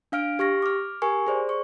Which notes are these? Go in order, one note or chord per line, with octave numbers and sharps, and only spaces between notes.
D4 F5 F6 D7
G4 C#6 F6 A#6
D6 F6
G4 A#4 G#5 C#6
G#4 C5 D5
C#6